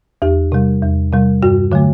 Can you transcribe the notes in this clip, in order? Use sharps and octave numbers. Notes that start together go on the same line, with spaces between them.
E2 G4
C3 G3
E2
C3 G3
G2 F#4
D3 F#3 A3